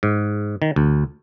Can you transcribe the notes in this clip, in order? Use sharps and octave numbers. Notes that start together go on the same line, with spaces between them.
G#2
D#3
D2